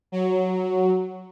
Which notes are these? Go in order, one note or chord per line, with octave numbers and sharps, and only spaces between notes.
F#3